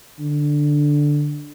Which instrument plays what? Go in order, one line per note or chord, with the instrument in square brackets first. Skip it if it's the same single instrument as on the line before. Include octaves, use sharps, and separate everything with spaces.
[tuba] D3